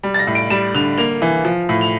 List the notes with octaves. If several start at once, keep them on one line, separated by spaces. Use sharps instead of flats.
G3
A6
A#6
A2
D7
G3 E7
D3 F7
A#3 F7
E3
F3
A2
F7